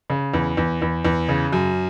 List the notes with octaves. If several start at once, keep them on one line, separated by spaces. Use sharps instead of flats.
C#3
E2
E2
E2
E2
C#3
F#2